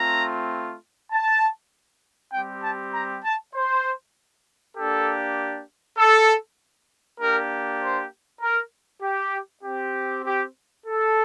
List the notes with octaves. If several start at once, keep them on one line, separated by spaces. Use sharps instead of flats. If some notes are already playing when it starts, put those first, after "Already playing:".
Already playing: A3 C4 F4 A#5
A5
G3 C4 G4 G5
A5
A#5
A5
C5
A#3 D4 G4 A4
A4
A#3 D4 G4 A#4
C5
A#4
G4
C4 G4
G4
A4